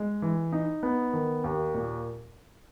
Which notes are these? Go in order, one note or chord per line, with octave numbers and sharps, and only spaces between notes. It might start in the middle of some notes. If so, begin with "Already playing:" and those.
Already playing: G#3
E3
D#4
B3
D#3
D#2
A#2